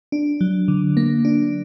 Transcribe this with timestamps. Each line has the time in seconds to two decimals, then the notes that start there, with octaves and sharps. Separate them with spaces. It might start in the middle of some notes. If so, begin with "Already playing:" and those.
0.12 D4
0.41 F#3
0.68 D3
0.97 A#3
1.25 D4